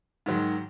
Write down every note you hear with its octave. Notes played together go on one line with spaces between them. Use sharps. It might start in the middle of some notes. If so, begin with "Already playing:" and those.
G#2 D#3 F#3